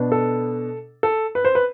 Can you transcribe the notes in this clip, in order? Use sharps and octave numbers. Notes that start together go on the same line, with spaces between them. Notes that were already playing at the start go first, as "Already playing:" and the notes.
Already playing: B2 B3 D4
A4
A4
B4
C5
B4